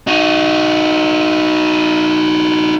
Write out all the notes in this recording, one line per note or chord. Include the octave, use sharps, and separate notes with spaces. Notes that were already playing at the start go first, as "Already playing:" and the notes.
D#4 F#4